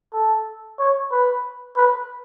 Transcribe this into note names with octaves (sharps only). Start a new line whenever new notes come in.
A4
C#5
B4
B4